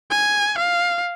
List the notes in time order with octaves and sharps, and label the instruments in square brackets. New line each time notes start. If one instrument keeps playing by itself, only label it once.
[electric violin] G#5
F5